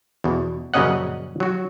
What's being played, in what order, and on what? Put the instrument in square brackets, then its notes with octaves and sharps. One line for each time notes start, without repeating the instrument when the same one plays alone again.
[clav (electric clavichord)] E2 B2
A#1 F#2 C#3 C#4 D#5 F#5
F#3 F#4